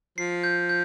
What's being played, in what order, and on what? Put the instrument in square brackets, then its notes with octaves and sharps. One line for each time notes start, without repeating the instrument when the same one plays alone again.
[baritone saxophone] F3 [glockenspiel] C7
[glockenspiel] G6
G6